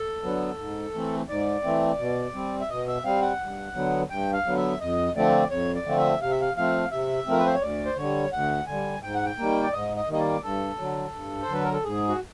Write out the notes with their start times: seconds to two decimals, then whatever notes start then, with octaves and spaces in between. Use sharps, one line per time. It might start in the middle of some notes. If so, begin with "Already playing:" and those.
Already playing: A4
0.23 D3 F#3 B3
0.58 G#2
0.94 E3 A3 C4
1.29 G#2 D5
1.64 E3 A3 C4
1.99 B2
2.34 G3 C4
2.60 E5
2.70 B2 D#5
2.88 E5
3.04 G3 C4 F5
3.22 F#5
3.40 G2
3.75 D3 F#3 B3
4.10 G2 G5
4.33 F5
4.46 D3 F#3 B3
4.57 E5
4.80 F2 D#5
5.15 D3 F3 A3 C4 D5
5.50 F2 C#5
5.75 D5
5.86 D3 F3 A3 C4
5.98 E5
6.21 C3 F5
6.31 E5
6.41 F5
6.57 F3 A3 C4 F5
6.91 C3 E5
7.27 F3 A3 C4 A#4
7.39 B4
7.46 C5
7.55 C#5
7.61 D2 D5
7.85 C5
7.97 D3 G3 C#5
8.32 D2 F#5
8.67 D3 G#5
8.72 G3
9.03 G#2 G5
9.14 F#5
9.25 G5
9.38 D#3 G3 A#3
9.63 D5
9.73 G#2 D#5
9.96 D#5
10.08 D#3 G3 A#3 D#5
10.20 D5
10.43 G2 A4
10.79 D3 F#3
11.14 G2
11.42 C5
11.49 D3 F#3 B4
11.64 A#4
11.73 A4
11.85 G#2 G#4
12.08 F#4